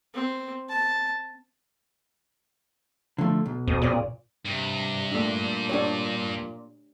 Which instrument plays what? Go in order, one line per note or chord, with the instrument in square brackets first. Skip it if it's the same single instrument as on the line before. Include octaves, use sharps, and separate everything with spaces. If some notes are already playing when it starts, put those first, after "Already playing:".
[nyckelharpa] C4
A5
[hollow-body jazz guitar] D3 F3 A3
B1
[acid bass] F2 [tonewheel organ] B2 C4 D#6
[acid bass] A#2 [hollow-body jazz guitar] G#4 C#5 D5
[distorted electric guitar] G2 [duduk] C3
[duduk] A#2 [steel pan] A3 D4
[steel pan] D4 G4 C#5